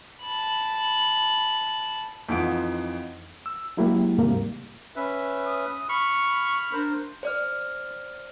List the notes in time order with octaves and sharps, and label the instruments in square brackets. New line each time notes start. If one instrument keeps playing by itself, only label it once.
[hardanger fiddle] A5 B5
[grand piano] F2 E3 D#4 F4 F#5 D7
[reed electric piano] E6
F#3 G#3 A#3 E4 F#4 G4
D#2 G#2 C3 G3 A#3
[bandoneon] C#4 B4 E5
[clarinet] D#6
[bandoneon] B5 F6 [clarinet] C#6
[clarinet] D4 [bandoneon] A#4 C5
[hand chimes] C5 D5 F6